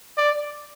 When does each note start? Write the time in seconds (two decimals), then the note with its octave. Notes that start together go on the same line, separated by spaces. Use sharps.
0.18 D5